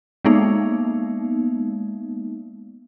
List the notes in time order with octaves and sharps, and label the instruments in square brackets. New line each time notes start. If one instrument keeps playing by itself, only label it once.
[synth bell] G#3 A#3 B3 D#4